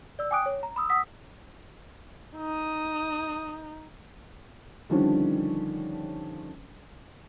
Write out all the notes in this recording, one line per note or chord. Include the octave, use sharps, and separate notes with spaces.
D5 E6
G5 G#5 D6 D#6 F#6 D7
C#5
A#5
B5 D#6 E6
F#5 D#6 E6 B6
D#4 D#6
D3 D#3 F3 G3 C#4 D4